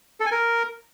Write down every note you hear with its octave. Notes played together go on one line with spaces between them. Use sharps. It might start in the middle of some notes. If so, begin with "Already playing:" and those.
A4
G#5
A#4